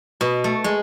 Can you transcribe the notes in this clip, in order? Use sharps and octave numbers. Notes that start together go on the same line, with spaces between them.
B2
A3
G#3